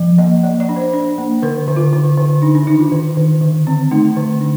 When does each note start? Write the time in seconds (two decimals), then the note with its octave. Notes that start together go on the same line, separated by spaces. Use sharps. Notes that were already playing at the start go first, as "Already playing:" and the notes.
Already playing: F3
0.18 A#3 D#5
0.43 A#3 D5
0.60 D5
0.69 D4
0.76 C5
0.93 D4
1.18 A#3
1.42 D3 A#4
1.68 D3
1.77 F4
1.93 D3
2.17 D3
2.42 D4 D#4
2.55 D4
2.67 D#3 D#4
2.80 F4
2.92 D#3
3.17 D#3
3.41 D3
3.67 C4
3.91 A3 D#4
4.17 D3
4.41 D4